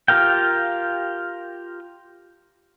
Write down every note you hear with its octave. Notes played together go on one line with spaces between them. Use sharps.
F4 G4 A#4 F5 G5